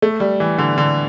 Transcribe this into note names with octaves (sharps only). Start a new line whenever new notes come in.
A3
G3
E3
D3
D3